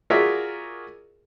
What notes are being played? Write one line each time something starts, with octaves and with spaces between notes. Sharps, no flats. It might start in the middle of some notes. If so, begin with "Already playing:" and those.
F4 F#4 G#4 A#4 D5 E5